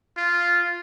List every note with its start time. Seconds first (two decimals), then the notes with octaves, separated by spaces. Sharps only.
0.17 F4